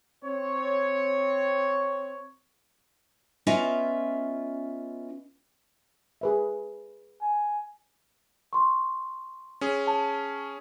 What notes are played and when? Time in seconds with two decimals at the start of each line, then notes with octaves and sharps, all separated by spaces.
0.25 C4 C#5
3.47 B3 C#4 F4 D#5 E5
6.21 G#4 B4 E5
7.22 G#5
8.53 C6 C#6
9.61 C#4 G#4
9.87 A5